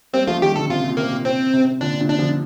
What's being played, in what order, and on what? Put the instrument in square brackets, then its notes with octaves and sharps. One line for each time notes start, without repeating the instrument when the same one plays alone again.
[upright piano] G3 A#3 [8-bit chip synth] C4
[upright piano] F3 A3 [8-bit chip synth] F4
[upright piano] D#3 G3 [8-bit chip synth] G4
[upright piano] A#2 D3 [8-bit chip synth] A4
[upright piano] C3 [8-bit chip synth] F4
[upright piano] A#2
[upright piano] C3 [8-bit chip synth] A#3
[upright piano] A#2
[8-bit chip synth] C4
[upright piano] C3
[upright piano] A#2 D3 [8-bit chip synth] D4
[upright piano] A#2 D3
[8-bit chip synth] D4
[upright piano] D3 F3